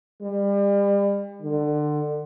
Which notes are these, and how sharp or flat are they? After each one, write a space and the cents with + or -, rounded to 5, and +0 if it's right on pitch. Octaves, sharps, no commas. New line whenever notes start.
G3 +35
D3 +25